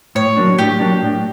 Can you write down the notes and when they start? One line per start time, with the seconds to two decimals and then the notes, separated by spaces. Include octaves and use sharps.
0.15 A2 C#5
0.37 F#3 A#3 D4
0.58 A2 G4
0.80 F#3 A#3 D4
1.02 A2